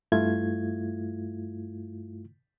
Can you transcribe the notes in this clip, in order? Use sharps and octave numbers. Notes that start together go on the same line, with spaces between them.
G2 A3 E4 F4 G#6